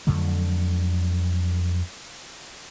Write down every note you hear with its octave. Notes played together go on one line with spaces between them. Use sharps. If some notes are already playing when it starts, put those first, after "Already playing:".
F2 D3 F#3 A3